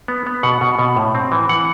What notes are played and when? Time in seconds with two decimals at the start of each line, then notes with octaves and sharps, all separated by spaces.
0.08 B3
0.26 B3
0.43 B2 F#5
0.61 B2
0.79 B2
0.97 A2
1.15 C4
1.32 E3
1.49 E3 F#5